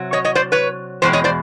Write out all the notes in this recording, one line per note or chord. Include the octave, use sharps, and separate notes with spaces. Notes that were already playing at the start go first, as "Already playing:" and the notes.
Already playing: C3 F#3
C#5 D#5
C#5 D#5
C5 D5
B4 C#5
E2 B2 G#3 C4 C5
C#5 D#5
C5 D5